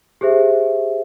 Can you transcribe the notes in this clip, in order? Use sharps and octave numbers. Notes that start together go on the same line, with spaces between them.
G4 G#4 C5 E5